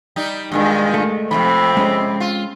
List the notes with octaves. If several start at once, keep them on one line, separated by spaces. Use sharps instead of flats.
G3 D#4
G2 A#2 D#3 G#3
A3
F2 C3 E3 C4 B5
G#3 C#4 D#5
F4